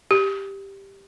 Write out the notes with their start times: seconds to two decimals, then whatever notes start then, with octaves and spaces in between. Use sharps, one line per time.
0.11 G4